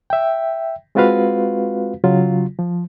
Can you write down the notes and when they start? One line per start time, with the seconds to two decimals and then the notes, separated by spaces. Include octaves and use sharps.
0.10 E5 G5
0.95 G#3 C4 F4 F#4 B4 F5
2.04 C#3 F#3 F4
2.59 F3